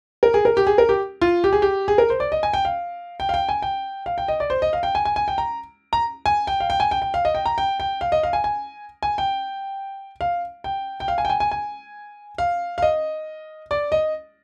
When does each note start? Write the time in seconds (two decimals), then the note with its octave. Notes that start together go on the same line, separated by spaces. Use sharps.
0.23 A#4
0.34 G#4
0.45 A#4
0.57 G4
0.67 G#4
0.78 A#4
0.89 G4
1.21 F4
1.44 G4
1.53 G#4
1.62 G4
1.88 G#4
1.98 A#4
2.10 C5
2.20 D5
2.32 D#5
2.43 G#5
2.53 G5
2.65 F5
3.20 G5
3.29 F5
3.34 G5
3.49 G#5
3.62 G5
4.06 F5
4.18 G5
4.28 D#5
4.40 D5
4.50 C5
4.62 D#5
4.73 F5
4.83 G5
4.95 G#5
5.05 G#5
5.16 G#5
5.28 G5
5.38 A#5
5.93 A#5
6.26 G#5
6.47 G5
6.60 F5
6.70 G5
6.80 G#5
6.91 G5
7.02 G5
7.14 F5
7.25 D#5
7.35 G5
7.46 A#5
7.58 G5
7.80 G5
8.01 F5
8.12 D#5
8.23 F5
8.33 G#5
8.44 G#5
9.03 G#5
9.18 G5
10.21 F5
10.64 G5
11.00 G5
11.08 F5
11.18 G#5
11.25 G5
11.30 G#5
11.40 G#5
11.51 G#5
12.38 F5
12.78 F5
12.82 D#5
13.71 D5
13.92 D#5